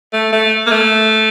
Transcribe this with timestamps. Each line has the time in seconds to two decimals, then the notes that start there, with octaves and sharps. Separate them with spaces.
0.13 A3
0.32 A3
0.66 A#3
0.71 A3